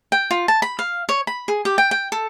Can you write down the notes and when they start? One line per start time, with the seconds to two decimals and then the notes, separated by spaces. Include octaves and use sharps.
0.12 G5
0.31 F4
0.48 A5
0.62 B5
0.79 F5
1.09 C#5
1.27 B5
1.48 G#4
1.65 G4
1.78 G5
1.91 G5
2.12 A4